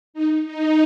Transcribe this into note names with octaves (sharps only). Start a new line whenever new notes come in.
D#4
D#4